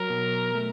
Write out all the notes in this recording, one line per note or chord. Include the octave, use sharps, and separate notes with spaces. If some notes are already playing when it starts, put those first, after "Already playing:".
Already playing: F#3 A#4
B2
A3